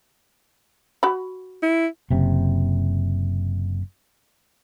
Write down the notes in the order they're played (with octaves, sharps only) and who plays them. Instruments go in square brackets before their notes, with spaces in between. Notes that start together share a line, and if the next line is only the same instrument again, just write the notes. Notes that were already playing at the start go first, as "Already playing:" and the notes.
[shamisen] F#4 B5
[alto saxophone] E4
[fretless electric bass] F#1 C3